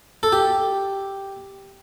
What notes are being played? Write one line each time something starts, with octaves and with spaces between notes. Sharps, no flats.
A4
G4